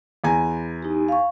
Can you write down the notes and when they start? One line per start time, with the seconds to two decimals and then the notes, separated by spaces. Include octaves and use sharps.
0.24 E2 G#5 A#5
0.82 D#4 G4
1.08 F5 C#6